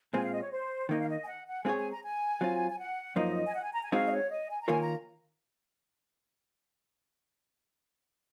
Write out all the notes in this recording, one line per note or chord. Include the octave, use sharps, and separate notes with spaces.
A#2 G#3 C4 F4 G#5
F5
D#5
C#5
C5
D#3 A#3 D#4 D#5
F5
D#5
G#5
F#5
F#5
G#3 C4 F4 G#4 C#5 G#5
G#5
A#5
G#5
F#3 C4 F4
G#5
F#5
F#2 F3 A#3 D#4 D#5
G#5
F#5
G#5
A#5
G#5
G#3 C4 D#4 F#4 F5
D#5
C#5
D#5
G#5
A#5
D#3 A#3 F4 A#4 C#5 G#5
A#5